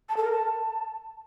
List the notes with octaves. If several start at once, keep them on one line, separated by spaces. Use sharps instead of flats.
A5
A4
A#4
A5